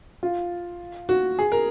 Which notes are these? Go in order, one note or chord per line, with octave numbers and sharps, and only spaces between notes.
F4
F#4
G#4
A#4